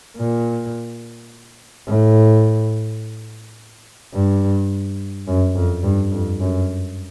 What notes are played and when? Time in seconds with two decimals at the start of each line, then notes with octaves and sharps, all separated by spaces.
0.17 A#2
1.87 A2
4.14 G2
5.27 F#2
5.55 F2
5.83 G2
6.12 F2
6.40 F#2